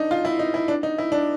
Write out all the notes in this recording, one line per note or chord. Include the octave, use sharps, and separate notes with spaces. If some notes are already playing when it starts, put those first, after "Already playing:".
Already playing: D4 D#4
F4
E4
D#4
E4
D4
D#4
E4
D4